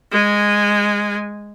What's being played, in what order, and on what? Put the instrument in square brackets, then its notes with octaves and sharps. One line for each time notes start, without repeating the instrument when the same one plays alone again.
[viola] G#3 G#5